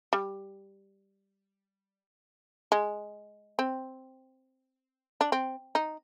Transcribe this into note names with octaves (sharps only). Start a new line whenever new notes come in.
G3
G#3
C4
D4
C4
D#4